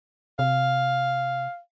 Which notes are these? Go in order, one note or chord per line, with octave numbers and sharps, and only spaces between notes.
C3 F5